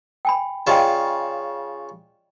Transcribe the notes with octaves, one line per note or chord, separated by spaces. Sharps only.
G5 G#5 B5
C#3 F4 D5 D#5 G5 A5